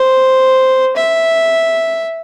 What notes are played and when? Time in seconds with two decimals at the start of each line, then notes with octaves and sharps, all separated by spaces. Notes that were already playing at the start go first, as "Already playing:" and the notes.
Already playing: C5
0.96 E5